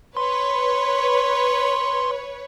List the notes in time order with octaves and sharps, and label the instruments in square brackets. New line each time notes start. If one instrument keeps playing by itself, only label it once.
[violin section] B4 C#5 [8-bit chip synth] C6